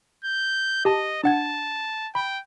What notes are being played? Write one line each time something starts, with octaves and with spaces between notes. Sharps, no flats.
G6
G4 D#5 A5
D4 F#5 A5 G#6
G5 B5